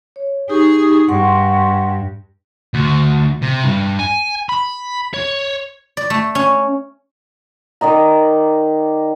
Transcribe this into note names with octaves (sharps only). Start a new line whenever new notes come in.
C#5
D#4 G4 G#4 C#6
G2 F#5 C6 C#6
D2
C3
G2
G#5
B5
C#5
D5
A3
C#4
D#3 D5 D#5 A#5